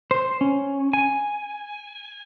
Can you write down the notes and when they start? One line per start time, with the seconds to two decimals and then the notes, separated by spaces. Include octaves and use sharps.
0.11 C5
0.41 C#4
0.93 G#5